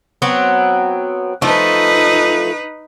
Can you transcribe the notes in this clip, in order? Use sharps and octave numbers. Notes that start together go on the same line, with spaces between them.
F#3 B3 C4
F3 A3 D#4 B4